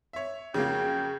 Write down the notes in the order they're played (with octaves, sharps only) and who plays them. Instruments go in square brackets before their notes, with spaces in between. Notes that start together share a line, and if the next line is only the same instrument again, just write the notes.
[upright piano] C#5 E5
[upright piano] F2 F#3 A#3 [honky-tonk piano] C#3 [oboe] G5